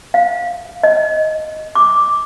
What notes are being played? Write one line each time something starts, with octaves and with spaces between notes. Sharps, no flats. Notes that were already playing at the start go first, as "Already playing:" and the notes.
F5
D#5
D6